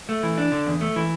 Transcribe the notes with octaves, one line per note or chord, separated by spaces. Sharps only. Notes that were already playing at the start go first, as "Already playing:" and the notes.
A3
E3
D4
D3
E2
A3
E3